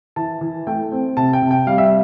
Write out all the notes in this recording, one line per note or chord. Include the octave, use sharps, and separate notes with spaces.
E3 A5
E3
A3 G5
C4
C3 A5
G5
C3
G5
G3 F5
E5